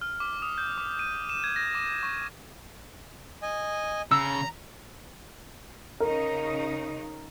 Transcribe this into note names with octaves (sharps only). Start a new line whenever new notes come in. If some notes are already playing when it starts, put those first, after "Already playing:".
F6
D6
D#6
G6
D6
D#7
E7
G#6
A#6
D6
C#6
D#5 G#5
C#3 A#5 E6
C#3 D#4 A#4